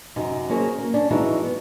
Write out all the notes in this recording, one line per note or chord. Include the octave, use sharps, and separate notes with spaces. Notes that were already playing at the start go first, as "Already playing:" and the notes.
F#2 C3 D#4
F#3 A#3 C#4 G#4 C5
A#3
C#4 D4
E3 F#3 G#3 D#4 E4 F#4
B3